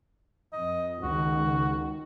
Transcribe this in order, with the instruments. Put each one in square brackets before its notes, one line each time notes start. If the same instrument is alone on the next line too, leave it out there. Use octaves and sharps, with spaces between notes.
[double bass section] F2 [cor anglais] D#5
[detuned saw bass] C#2 [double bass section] D#3 [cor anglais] F#4